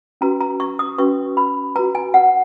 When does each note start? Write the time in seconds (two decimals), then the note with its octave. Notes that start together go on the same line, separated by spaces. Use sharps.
0.21 C#4 F#4 B4 A#5
0.41 A#5
0.60 C#6
0.79 D#6
0.98 C#4 F#4 B4 C#6
1.37 B5
1.76 F#4 B4 A#5
1.95 G#5
2.14 F#5